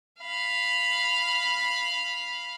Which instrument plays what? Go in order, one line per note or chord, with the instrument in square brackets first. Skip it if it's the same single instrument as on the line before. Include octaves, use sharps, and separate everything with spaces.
[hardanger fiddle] F5 B5